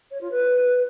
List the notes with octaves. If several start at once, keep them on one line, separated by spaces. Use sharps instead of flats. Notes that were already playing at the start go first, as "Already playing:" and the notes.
C#5
F4
B4